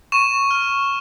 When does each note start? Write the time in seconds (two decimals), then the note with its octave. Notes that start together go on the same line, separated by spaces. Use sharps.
0.12 C#6 E7
0.51 F6